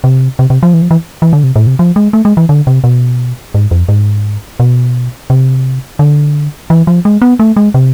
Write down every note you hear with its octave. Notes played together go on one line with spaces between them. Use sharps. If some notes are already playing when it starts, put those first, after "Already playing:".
C3
C3
C3
F3
E3
F3
E3
E3
D3
C3
A2
C3
F3
G#3
A3
G#3
E3
D3
C3
B2
G#2
F2
G#2
B2
C3
D3
E3
F3
G#3
B3
A3
G#3
C3